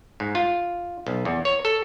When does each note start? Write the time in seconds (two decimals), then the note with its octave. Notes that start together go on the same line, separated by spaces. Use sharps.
0.20 G#2
0.35 F4
1.07 B1
1.25 E2
1.45 C#5
1.65 A4